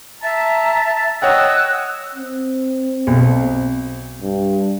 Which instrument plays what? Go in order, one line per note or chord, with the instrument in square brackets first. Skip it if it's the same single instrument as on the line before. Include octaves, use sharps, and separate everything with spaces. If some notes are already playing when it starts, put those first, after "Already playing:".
[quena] E5 [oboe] A5 [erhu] A#5
[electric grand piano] C#5 F#5 G5 [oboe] D#5 [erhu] E6 [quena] F#6
[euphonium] C4
[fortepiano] B1
[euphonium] G2